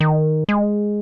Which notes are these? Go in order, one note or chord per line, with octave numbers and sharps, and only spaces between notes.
D#3
G#3